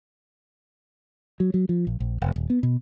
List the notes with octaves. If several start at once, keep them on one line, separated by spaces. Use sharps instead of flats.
F#3
F#3
F3
A#1
A#1
F1
D#1
B3
B2